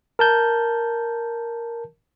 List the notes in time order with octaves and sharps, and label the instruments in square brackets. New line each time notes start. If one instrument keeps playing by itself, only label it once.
[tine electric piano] A#4 A5 G6